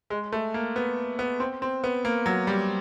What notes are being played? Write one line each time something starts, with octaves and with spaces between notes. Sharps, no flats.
G#3
A3
A#3
B3
B3
C4
C4
B3
A#3
F#3
G3